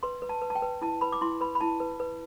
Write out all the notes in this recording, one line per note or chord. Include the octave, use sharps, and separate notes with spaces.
B4 C6
B4
A5
B4
A5
G5
B4
E4 A5
B4 B5
D6
E4 C6
B4 B5
B5
E4 A5
B4
B4